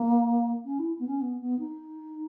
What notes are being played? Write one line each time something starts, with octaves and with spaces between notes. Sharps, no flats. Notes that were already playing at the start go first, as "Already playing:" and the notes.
Already playing: A#3
C#4
E4
B3
C#4
B3
B3
D#4